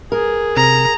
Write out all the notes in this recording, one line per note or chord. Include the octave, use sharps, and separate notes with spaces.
G#4 A#4
C3 A#5